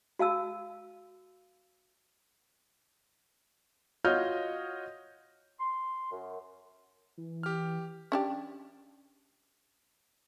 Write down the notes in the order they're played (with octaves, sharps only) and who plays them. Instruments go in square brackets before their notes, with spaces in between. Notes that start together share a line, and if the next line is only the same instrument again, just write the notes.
[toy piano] F#4 F5 A5 E6
[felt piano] F4 F#4 C#5 D#5 F6 G6
[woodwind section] C6
F#2
[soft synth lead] E3
[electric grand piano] G4 F6
[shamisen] C#4 D4 G4